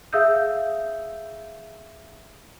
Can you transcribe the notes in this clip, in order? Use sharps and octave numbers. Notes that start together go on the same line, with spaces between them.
G#4 E5 F5 D#6 E6 G6